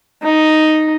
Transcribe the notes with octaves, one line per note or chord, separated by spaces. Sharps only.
D#4